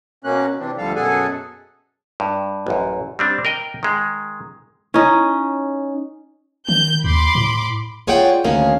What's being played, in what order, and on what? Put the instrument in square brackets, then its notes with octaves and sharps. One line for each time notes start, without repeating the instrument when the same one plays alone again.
[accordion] B2 A#3 C#4 F#6
C3 E3 C4 D4
D2 D3 F3 G3 A4 F5
F#2 B2 G#4 A4 F#5 G#5
[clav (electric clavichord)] G2
A1 F#2
G3 C4 D4
A#4 D#5 G5
D#3 G#3
[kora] C#4 D#4 [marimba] E4
[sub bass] D#3 [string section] G6
[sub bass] D#2 [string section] B5 C6 D6
[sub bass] A2
[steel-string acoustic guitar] F4 G#4 C#5 D5 F#5 G5
D2 D#3 A#3 C#4 G#4 F5